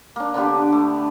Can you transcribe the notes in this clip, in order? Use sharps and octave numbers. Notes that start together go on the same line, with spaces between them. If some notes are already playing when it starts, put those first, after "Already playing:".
A#3 D4
D3 B3 D4 G4
A3